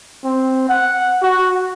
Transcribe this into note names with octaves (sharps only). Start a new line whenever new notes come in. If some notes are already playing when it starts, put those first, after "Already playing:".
C4
F#5
F#4